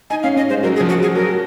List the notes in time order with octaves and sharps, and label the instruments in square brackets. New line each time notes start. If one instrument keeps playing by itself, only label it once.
[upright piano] D#4 [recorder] G#5
[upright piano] C#4 [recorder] F5
[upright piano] C#4 [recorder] D#5
[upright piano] G#3 [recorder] C5
[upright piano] F#3 [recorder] A#4
[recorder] G#4
[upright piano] F3
[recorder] F#4
[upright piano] F#3 [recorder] G#4
[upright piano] F#3 [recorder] A#4
[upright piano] F#3